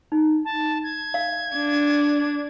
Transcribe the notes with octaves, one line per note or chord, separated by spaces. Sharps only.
D#4
A5
G#6
F5
D4